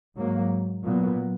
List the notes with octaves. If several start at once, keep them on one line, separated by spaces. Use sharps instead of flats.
G#2 F#3 A#3
A#2 F#3 B3